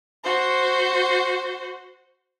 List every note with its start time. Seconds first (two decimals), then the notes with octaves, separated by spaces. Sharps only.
0.24 F#4 C5